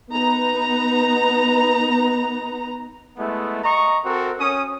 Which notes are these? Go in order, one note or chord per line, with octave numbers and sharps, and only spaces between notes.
B3 D#4 B4 A#5
G#3 A3 B3 E4
D#5 A#5 C#6
C4 F#4 A4 A#4
C#4 D#6